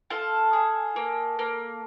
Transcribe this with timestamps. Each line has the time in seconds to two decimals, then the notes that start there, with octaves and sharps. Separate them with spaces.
0.10 F4 A4
0.53 G#4
0.96 A#3
1.39 A#3